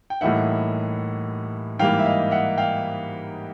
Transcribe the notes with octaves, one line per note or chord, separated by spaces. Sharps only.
G5
A2 E3 G3 A#3 D#4 E5 F#5
G#2 E3 G3 A#3 F5 G5
E5
D#5 F5
E5 F#5
F5 G5